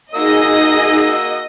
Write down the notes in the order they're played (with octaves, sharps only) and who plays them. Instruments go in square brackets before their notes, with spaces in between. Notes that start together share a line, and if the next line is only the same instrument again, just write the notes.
[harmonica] A#3 F#4 E6 [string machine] D#4 G#4 [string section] D#5